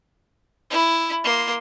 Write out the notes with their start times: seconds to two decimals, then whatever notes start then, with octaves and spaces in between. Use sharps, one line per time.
0.70 E4
1.24 A#3 C6